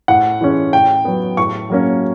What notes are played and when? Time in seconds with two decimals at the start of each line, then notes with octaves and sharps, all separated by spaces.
0.08 A2 F#5
0.41 E3 G#3 C#4
0.73 A2 G5
1.05 F#3 B3
1.37 A2 C#6
1.70 F#3 A#3 C#4